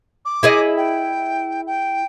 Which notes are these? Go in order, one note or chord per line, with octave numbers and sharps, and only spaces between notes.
D6
E4 G#4 D#5
G5
G5